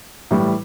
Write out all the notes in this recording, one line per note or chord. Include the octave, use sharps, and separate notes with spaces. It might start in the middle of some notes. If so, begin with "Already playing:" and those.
A2 E3 G3